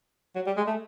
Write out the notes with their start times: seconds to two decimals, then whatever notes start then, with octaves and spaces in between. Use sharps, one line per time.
0.36 F#3
0.47 G3
0.57 G#3
0.67 A3